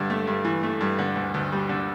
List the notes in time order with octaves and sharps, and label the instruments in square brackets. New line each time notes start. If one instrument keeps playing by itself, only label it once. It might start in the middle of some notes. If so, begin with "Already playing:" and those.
Already playing: [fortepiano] G2 D3
A3
G2
E3
A3
G2
D3
D2
D2
G3
D3